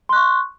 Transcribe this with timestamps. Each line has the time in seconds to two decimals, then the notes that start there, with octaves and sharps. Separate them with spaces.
0.09 C6
0.13 F#6
0.16 C#6